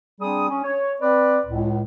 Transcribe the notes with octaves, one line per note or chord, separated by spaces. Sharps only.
G3 C4 D4 G#4 D#6
C#4
C#5
C4 B4 D5
C#2 A2